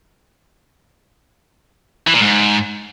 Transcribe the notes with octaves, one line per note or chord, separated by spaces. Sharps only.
E3
A#2
G#2